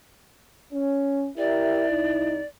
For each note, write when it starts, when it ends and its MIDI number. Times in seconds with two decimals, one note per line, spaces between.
0.73 1.28 61
1.37 2.36 64
1.37 1.85 67
1.37 1.85 70
1.37 2.45 74
1.37 1.85 76
1.90 2.40 36
1.90 2.40 63